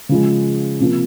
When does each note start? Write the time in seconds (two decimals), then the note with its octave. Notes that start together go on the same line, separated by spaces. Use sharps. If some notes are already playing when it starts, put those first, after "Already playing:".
0.09 C#3 F3 G#3
0.80 C3 F3 A#3